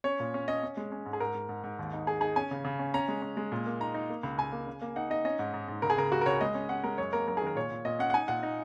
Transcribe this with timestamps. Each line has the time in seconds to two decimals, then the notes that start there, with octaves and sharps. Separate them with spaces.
0.04 C#4 C#5
0.20 A#2
0.34 C#4
0.48 C#4 D#5
0.63 C#4
0.77 G#3
0.92 C#4
1.06 G#2
1.13 G#4
1.20 G#2 A#4
1.34 G#2
1.49 G#2
1.64 G#2
1.79 D#2
1.93 D#4
2.07 D#4 G#4
2.21 D#4 G#4
2.36 C#4 G#5
2.51 C#3
2.64 C#3
2.79 C#4
2.94 C#4 A#5
3.08 G#3
3.22 C#4
3.37 G#3
3.52 A#2
3.66 A#3
3.80 D#4 A#5
3.94 D#4
4.09 A#3
4.23 C#2
4.38 C#2 G#5
4.52 A#3
4.67 C#3
4.82 A#3
4.96 D#4 F#5
5.10 D#4 D#5
5.25 C#4 D#5
5.39 G#2
5.54 G#2
5.68 G#2
5.82 C#2 A#4
5.90 G#4
5.98 C#3 A#4
6.12 C#2 F#4
6.21 A#4
6.26 C#2 C#5
6.41 G#3 D#5
6.55 C#4
6.69 C#4 F#5
6.84 G#3 A#4
6.98 F#2 C#5
7.13 A#3 A#4
7.28 F#2 A#4
7.37 D#3 G#4
7.47 A#4
7.56 A#2 C#5
7.71 A#2
7.85 A#2 D#5
7.99 C#4 F#5
8.10 F#5
8.14 D#4 G#5
8.28 A#2 F#5
8.43 D#4